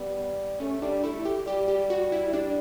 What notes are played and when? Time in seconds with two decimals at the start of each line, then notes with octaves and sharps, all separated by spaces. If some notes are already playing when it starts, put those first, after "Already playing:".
Already playing: G3 B3
0.60 A3 C#4
0.82 G3 D4
1.03 A3 E4
1.25 G4
1.46 G3 G4
1.68 G4
1.90 F#4
2.12 E4
2.33 G3 D4